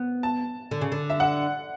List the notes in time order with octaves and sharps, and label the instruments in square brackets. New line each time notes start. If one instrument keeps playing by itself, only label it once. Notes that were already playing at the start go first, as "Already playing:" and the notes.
Already playing: [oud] B3
[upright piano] A5
[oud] D3
C#3
D3
[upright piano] E5
F#5